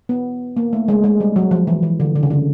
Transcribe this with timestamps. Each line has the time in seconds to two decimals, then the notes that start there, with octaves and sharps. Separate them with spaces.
0.09 B3
0.57 A#3
0.73 A3
0.88 G#3
1.04 G#3
1.20 G3
1.36 F#3
1.51 F3
1.67 E3
1.83 E3
2.00 D3
2.16 D3
2.23 C#3
2.30 D3